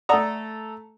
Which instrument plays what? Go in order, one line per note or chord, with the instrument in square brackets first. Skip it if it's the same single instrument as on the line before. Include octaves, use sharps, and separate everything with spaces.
[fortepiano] A3 A4 A#5 [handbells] D5 F#5 D#6